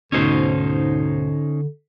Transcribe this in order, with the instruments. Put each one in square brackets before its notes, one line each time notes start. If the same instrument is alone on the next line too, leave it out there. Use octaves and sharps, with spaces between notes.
[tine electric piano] D2 B2 [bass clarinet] G#2 [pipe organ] D3 [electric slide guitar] C#4 D#4 C5